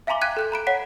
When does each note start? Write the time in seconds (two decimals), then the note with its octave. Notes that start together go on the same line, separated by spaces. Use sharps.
0.07 E5 F5 G#5 A#5 C6 D6
0.21 G5 D6 F#6 G#6 B6 D#7
0.37 A4 F#6 G6
0.52 A#5 B5 D7
0.67 C#5 F#5 B6